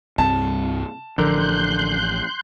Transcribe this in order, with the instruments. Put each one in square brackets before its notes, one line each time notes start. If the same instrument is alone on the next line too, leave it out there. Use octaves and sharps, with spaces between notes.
[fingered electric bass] C2 G2 C4 [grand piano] A5
[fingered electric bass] A1 F3 [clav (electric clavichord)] D3 A#4 [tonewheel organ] C6 F#6 G6